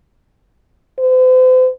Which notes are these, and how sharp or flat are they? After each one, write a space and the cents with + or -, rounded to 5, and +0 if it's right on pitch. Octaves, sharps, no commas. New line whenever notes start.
C5 -40